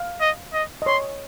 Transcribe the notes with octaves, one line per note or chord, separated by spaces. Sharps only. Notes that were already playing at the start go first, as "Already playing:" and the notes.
Already playing: F5
D#5
D#5
D#5
C#5 C6